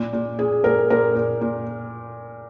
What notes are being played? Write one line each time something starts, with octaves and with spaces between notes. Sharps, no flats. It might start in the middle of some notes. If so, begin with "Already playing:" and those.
Already playing: A#2
A#2
A#2 G#4
A#2 A#4
A#2 A#4
A#2
A#2